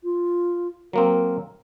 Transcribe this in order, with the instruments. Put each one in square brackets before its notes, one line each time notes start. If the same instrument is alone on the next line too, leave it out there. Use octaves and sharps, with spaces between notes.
[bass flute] F4
[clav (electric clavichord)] F#3 A#3 C4 [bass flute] A#4